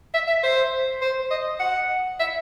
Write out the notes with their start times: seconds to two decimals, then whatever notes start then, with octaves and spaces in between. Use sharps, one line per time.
0.14 E5
0.28 E5
0.44 C5
1.02 C5
1.31 D#5
1.60 F#5
2.20 E5